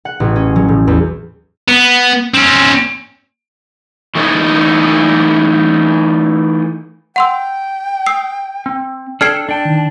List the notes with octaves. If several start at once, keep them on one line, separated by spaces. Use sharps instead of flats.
F#5
A1
C#4
F#3
A2
E2
B3
C4 C#4
E3 A3 D#4 E4 C#5 D#5
F#5 G5 C6 E6
D#6 E6 C7
C4
D4 A4 G5 F6 G#6 C7
D4 G5 A5
D#3